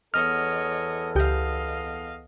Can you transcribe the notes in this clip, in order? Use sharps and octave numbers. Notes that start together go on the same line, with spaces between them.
E2 B3 A4 C#5 D#5 F6
C#2 G4 D#5 F5 G6